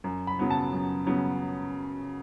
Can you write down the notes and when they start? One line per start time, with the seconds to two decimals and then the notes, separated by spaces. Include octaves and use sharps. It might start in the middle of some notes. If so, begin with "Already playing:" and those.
0.04 F#2
0.27 B5
0.39 C#3 F#3 B3
0.50 A5
0.73 F#2
1.06 C#3 F#3 B3